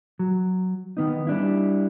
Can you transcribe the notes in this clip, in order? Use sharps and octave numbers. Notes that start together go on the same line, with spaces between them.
F#3
D#3 B3 D#4
G3 D4 E4